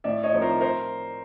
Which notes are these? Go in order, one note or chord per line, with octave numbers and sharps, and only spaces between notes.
A2 D5 E5
C#5 D#5
F3 A3 C4 D#4
A#4 C5
A#4 C5